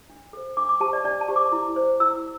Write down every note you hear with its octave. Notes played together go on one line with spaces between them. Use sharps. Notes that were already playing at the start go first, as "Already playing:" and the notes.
D4
A4 C5
D4 D6
D6
G4 C5 A5
D5
D4 D5
A5
G4 C5
D6
E4
C5
E4 E6